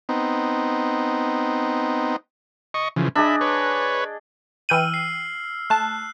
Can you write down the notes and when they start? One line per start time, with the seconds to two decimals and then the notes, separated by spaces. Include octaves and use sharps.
0.09 B3 C4 D#4
2.74 D#5 C#6
2.96 C#3 E3 F3
3.16 D4 G#4 D#5 E5 B5
3.41 B4 C#5
4.69 E3 G5 E6 F6 D#7 F#7
4.94 C7
5.70 A3 A5 F#6